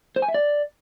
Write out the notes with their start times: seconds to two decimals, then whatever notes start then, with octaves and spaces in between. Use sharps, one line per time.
0.16 C5
0.22 G#5
0.28 E5
0.34 D5